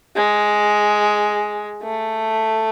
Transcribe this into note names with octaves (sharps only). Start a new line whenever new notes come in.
G#3
A3